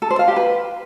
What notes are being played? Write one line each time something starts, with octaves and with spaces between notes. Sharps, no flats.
A4
C5
F5
G4
B4